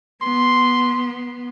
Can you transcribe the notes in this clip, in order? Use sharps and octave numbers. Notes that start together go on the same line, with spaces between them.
B3 C6